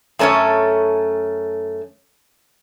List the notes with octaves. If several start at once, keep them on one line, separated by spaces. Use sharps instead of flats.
F#2 A3 C#4 A4 C#5